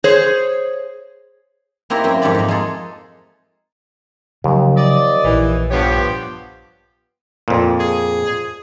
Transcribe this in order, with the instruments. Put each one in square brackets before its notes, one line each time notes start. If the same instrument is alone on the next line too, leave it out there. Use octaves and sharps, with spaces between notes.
[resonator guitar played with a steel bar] G#4 C5 C#5
[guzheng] A#3 C4 D#4 E4 G4 A#4
F#2 A#3 E4 G5
F2 G#2 E4 G4 D5 B5
A#3 D#4
G#3 F4 G#4 A4
[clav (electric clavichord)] D#2 [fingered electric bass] C#3 F3 F#3
[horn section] D5 D#5
[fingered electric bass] A#1 [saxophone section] E3
[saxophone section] G2 C#5 [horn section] F3 B3 G4
[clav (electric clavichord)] F2 A#2
[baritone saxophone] G#4